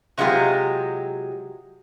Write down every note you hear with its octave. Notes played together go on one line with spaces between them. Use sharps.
C3 F#3 G#3 F4 G4